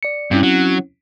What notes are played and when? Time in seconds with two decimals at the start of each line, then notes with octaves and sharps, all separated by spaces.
0.03 D5 C#7
0.31 G2 C4 C#4 E4
0.43 F#3